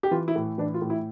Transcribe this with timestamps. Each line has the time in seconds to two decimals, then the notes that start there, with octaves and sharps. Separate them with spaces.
0.03 G4
0.11 E3 F4
0.28 E4
0.36 A2
0.58 E3 D4
0.74 F4
0.82 A2
0.90 E4